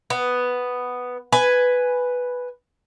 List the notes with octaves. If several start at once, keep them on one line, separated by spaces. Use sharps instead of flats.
B3
B4 G#5